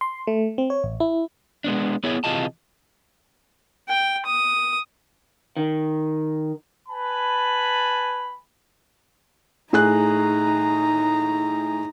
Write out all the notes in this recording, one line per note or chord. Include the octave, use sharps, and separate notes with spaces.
C6
A3
C4
C#5
A1
E4
G#3 B3 D4
B3 E4 G#4 C#5
C3 E3 F4 G#4 D#5 A5
G5
D#6
D#3
B4 G#5 A5 B5
A2 D#4 G#4 A#5 F#6